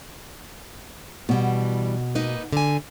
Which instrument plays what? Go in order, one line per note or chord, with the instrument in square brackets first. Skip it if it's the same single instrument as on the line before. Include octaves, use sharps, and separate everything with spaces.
[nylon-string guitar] B2 [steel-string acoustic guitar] E3 G3
[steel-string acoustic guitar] A#3 D#4 B4
D3 G#5